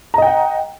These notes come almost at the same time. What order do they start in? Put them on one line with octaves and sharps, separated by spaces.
A#5 D#5 G5 F#5